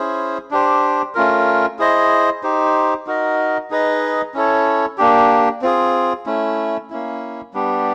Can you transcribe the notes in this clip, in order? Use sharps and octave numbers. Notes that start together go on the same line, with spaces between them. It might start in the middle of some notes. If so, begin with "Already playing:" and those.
Already playing: C#4 E4 G#4 C5
D4 G4 C5
A3 C#4 F4 A#4
E4 G#4 C5 D#5
D#4 G4 C5
D#4 F#4 A#4 D#5
D#4 G#4 B4 D#5
C#4 E4 A4 C#5
A#3 D4 G4
C4 F4 G#4
A3 C#4 E4
A#3 C#4 E4
G3 B3 D4 G4